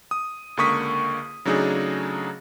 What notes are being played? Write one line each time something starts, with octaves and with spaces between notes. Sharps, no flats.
D#6
C#2 D3 A#3 C#6 D#6 B6
C#3 F#3 A3 D4 D#4 G#4